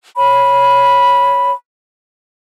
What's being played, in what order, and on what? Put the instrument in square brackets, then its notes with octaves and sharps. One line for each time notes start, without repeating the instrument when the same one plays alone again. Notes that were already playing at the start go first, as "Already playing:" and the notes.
[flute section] C#5 B5